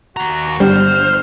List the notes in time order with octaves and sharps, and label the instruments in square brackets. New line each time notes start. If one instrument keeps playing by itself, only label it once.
[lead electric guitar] D#2 A#5 [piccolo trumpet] F#4
[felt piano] G1 [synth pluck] G3 [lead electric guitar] C5 [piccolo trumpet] F6